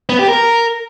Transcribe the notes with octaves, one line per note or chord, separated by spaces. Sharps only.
B3
G4
A#4